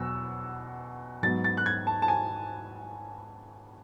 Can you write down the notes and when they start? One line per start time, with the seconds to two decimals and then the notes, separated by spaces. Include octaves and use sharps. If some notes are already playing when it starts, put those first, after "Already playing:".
Already playing: E2 B2 F#3 E6
1.23 G#2 F#3 B3 A6
1.44 A6
1.57 F#6
1.66 G#6
1.87 A5
2.02 A5
2.08 G#5